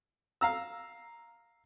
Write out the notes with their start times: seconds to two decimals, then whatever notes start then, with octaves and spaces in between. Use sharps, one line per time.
0.41 F5 A#5 E6